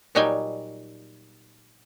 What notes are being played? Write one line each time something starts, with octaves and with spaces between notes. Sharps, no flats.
A#2 F#3 G3 D#4 G5 G#5